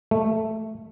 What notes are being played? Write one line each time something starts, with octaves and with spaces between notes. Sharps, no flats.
A3